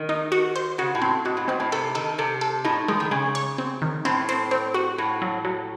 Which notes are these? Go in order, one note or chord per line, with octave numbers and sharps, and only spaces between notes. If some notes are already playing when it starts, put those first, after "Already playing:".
Already playing: D#3
D#4
F#4
C5
C#3 F#4
A2
C4
G#2 F#4
A2
G#2 C4
A2
C3 A4
D#3 A4
C3 A4
A4
A2 D#4
D#3 G#3
D#3
C#3 G#3
C#5
C4
D#3
A2 C4
C4
C4
F#4
A2 F#4
F#3
F#3